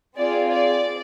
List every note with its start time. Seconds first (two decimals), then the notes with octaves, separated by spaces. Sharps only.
0.16 C4 F4 G#4 D5
0.51 D5